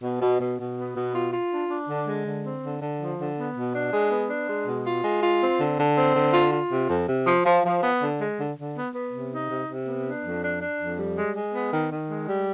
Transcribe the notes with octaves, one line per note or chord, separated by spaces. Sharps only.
B2
B2
B2
B2
B3
B2
F4
F4
D4
D4
D3
G#3
D3
C4
D3
D3
F3
D3
B3
B2
D4
G#3
B3
D4
G#3
B2
F4
G#3
F4
C4
D3
D3
C4
D3
F4
F4
C3
F2
C3
F3
F3
F3
B3
D3
G#3
D3
D3
B3
B3
C3
D#4
C3
C3
B3
D4
F2
D4
D4
F2
G3
G#3
G#3
B3
D#3
D#3
G#3
G3